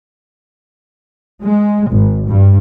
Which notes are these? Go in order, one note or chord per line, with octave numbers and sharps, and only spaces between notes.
G#3
G#1
G2